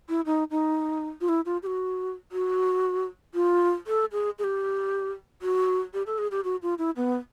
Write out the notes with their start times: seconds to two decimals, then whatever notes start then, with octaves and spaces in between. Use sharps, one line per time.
0.09 E4
0.26 D#4
0.51 D#4
1.21 F4
1.29 E4
1.46 F4
1.63 G4
1.67 F#4
2.32 F#4
3.35 F4
3.87 A4
4.12 G#4
4.39 G#4
4.44 G4
5.42 F#4
5.94 G4
6.07 A4
6.18 G#4
6.31 G4
6.44 F#4
6.62 F4
6.79 E4
6.97 B3